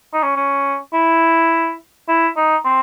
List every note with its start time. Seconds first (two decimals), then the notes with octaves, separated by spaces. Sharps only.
0.14 D#4
0.23 C#4
0.36 C#4
0.94 E4
2.08 E4
2.36 D#4
2.64 C4